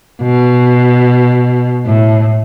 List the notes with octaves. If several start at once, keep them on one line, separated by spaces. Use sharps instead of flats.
B2
A2